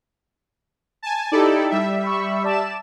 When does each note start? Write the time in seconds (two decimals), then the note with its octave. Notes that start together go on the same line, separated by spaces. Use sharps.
1.03 G#5 A5
1.32 D#4 E4 G4 A4 D5
1.70 G3 E5
2.04 B5 C#6 E6
2.43 D5 A5 E7